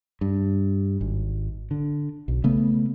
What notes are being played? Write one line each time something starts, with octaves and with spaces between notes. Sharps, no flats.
G2
G#1
D3
B1
C#3 A3 B3